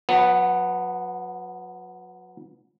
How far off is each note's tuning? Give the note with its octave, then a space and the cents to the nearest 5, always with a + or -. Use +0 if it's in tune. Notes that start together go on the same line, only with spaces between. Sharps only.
F#3 -35 B3 +0